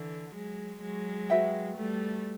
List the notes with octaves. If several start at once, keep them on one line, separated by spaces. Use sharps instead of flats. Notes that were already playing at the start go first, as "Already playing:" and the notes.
Already playing: D3 E3
F#3 G#3
F#3 G#3
F#4 B4 E5 G5
G3 A3